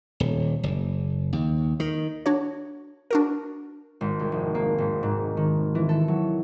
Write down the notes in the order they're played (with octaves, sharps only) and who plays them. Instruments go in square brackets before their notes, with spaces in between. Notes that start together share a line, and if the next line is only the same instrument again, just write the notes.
[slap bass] D#1
F#1
D#2
D#3
[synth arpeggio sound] D4 F#4 C#5
D4 F#4 A#4
[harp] G#1
C2
F1
A#3
G#1
G#2
D#3
E3
A4
F#3